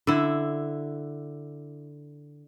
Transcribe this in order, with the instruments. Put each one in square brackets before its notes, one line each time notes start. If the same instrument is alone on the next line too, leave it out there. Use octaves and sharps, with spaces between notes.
[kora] D3 E4